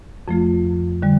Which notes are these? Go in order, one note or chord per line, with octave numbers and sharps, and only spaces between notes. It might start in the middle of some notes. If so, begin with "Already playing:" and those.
F2 F3 A3 F4
D3 G3